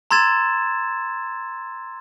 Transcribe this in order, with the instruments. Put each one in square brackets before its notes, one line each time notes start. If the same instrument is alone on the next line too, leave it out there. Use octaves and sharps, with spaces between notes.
[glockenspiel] A#5 C6 E6 G#6 A6 E7